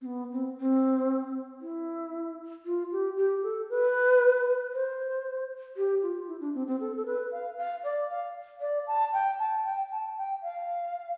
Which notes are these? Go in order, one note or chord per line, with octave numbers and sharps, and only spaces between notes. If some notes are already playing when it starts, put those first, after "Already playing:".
C4
B3
C4
C4
E4
F4
G4
G4
A4
B4
C5
G4
F4
E4
D4
C4
C4
A4
A4
B4
F5
F5
D5
F5
D5
A5
G5
A5
G5
A5
G5
F5